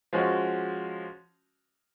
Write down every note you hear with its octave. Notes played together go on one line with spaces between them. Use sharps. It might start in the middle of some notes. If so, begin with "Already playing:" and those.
F3 G#3 C#4 F#4